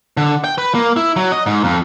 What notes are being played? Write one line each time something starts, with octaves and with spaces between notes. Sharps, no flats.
D3
G5
B4
A#3
E4
F#3
D#5
G#2
F2